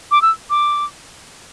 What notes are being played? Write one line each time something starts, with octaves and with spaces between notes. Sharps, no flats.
D6
E6
D6